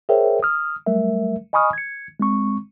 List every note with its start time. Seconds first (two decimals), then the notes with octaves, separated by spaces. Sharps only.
0.09 G#4 A#4 C5 C#5 E5 G5
0.43 D#6 F6
0.86 F#3 G3 A3 A#4 E5
1.53 D#5 G#5 B5 C#6 D#6 F6
1.73 G#6 C#7
2.20 G#3 C4 C#6